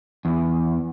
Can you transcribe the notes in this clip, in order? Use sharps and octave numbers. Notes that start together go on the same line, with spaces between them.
E2